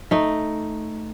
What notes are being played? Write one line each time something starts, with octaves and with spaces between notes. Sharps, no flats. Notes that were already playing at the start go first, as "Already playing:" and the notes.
A3 D#4